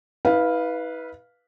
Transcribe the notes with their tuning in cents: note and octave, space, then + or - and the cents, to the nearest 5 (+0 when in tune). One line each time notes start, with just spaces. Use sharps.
E4 -40 B4 -10 F5 +0